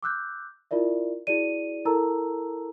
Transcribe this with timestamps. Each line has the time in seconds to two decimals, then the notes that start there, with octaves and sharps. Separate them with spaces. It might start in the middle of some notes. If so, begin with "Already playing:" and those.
0.03 D6 E6 F#6 G6
0.71 E4 F4 A#4 D5 E5
1.27 E4 F#4 G#4 D5 D#7
1.85 E4 A4 A#4 A5 A#5 E6